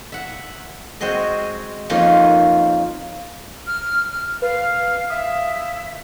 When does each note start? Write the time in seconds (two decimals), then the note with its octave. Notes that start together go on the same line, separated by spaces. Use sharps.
0.12 E5 F#5
1.01 G#3 C4 F#4 G#4 D#5
1.89 F2 A#3 C#4 D#4 F4 C6
3.67 F6
4.42 B4 F5
5.10 E5 F5 D#6